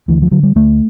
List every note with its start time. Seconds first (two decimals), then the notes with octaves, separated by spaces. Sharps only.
0.08 D2 E3
0.22 F3
0.31 D3 F#3
0.43 G3
0.56 D2 A3